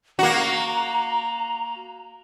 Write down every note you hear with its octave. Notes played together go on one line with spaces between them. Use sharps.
A#3 F#4 A#5